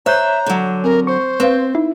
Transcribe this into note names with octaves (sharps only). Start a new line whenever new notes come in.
C5 C#5 E5 A#5 F#6 G6
D3 F#3
C4 A#4
C5 C#6
C4 B4 F5
D#4 E4